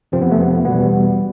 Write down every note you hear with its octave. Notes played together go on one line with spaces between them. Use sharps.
F2 C3 F3 C4
B3
A3
B3
E2 B2 G3 B3